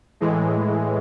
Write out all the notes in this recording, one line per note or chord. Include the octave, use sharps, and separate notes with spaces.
A2 E3 G#3